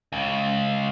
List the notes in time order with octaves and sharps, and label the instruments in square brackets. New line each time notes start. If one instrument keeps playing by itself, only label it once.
[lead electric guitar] C#2